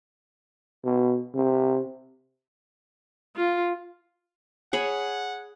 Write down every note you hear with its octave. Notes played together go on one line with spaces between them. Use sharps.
B2
C3
F4
G#4 C#5 F#5 B5